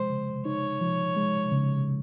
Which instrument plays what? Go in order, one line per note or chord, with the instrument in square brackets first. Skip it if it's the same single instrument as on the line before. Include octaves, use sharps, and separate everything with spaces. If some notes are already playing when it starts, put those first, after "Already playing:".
Already playing: [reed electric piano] F3 G#3 [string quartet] C5
[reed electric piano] C#3
[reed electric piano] D#4 [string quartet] C#5
[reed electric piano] F3
G#3
C#3